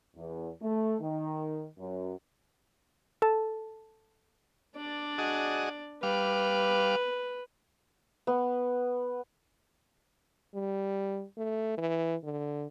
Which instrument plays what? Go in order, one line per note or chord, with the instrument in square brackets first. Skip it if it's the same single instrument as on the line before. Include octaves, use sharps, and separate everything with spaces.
[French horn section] E2
A3
D#3
F#2
[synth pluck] A4 A5
[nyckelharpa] D4 D5
[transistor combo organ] F#4 G#4 D#5
[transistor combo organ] G3 F5 D6 [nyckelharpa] B4
[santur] B3
[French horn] G3
A3
E3
D3